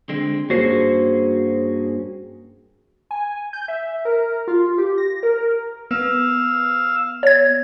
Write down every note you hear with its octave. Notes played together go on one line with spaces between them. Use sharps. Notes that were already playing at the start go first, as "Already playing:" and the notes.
D3 G#3 C4
G2 A#3 C#4 F#4 G#4 C5
G#5
G6
E5
A#4
F4
G4
A#6
A#4
A#4
B3 F5 E6
C#5 G#6